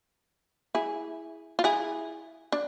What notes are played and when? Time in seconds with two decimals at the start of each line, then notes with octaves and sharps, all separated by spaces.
0.75 E4 G#4
1.59 F4
1.64 E4 G#4
2.52 D4